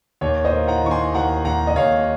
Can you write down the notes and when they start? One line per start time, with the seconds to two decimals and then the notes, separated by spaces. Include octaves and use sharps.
0.21 D#2 C#5
0.45 C5 D#5
0.53 A#3
0.68 F#5 A#5
0.84 D#3 C#6
0.91 G#5 C6
1.14 D#2 F#5 A#5
1.45 D#2 F#5 A#5
1.67 D#5
1.76 D#2 C#5 F5